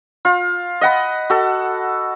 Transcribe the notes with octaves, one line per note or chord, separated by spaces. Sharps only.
F4
D#5 F#5 B5
F#4 A4